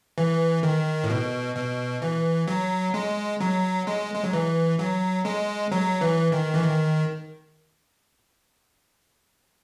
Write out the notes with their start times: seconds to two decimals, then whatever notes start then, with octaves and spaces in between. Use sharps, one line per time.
0.18 E3
0.63 D#3
1.04 A2
1.09 B2
1.56 B2
2.02 E3
2.48 F#3
2.94 G#3
3.40 F#3
3.87 G#3
4.14 G#3
4.24 F#3
4.33 E3
4.79 F#3
5.25 G#3
5.72 F#3
6.01 E3
6.32 D#3
6.54 E3
6.63 D#3